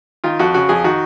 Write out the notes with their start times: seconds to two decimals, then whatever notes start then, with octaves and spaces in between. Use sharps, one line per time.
0.24 D#3 F4
0.39 F2 F#4
0.54 C#3 F#4
0.69 F2 G#4
0.84 D#3 F#4